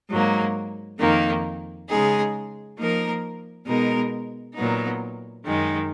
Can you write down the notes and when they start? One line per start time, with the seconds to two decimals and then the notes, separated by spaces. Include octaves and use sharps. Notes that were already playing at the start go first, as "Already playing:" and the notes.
0.10 G#2 F#3 A#3
0.99 F2 D#3 A#3
1.88 C#3 G#3 D#4 G#4
2.78 F3 A#3 D#4 A#4
3.67 B2 G#3 D#4 A#4
4.56 A#2 F#3 B3 D#4
5.46 F#2 D#3 G#3